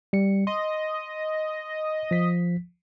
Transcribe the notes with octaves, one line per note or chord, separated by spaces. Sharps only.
G3 C#7
D#5 C6
F3 B6